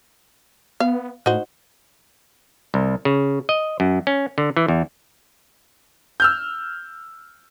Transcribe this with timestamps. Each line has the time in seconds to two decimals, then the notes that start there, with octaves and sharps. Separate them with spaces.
0.80 B3 F5
1.26 A2 D#4 F#4 C5
2.74 C2
3.05 C#3
3.49 D#5
3.80 F#2
4.07 C#4
4.38 D3
4.56 E3
4.68 E2
6.20 E6 F6 G6